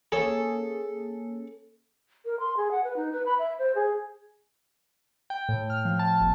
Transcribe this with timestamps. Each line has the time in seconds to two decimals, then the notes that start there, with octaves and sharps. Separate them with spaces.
0.12 A#3 C#4 G#4 A4
2.25 A#4
2.40 C6
2.57 G#4
2.71 F#5
2.84 B4
2.97 D#4
3.12 B4
3.26 B5
3.39 E5
3.59 C5
3.75 G#4
5.30 G5
5.49 A2
5.70 F6
5.85 F3
5.99 A5
6.21 G1